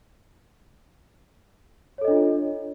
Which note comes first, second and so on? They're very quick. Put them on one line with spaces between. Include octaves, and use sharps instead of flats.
C#5 A4 D#5 D4 F4